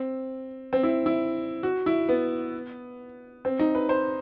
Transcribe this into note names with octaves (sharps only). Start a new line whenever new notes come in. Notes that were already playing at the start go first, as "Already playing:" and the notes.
Already playing: C4
C4
E4
E4
F#4
E4
B3
C4
D#4
B4
C5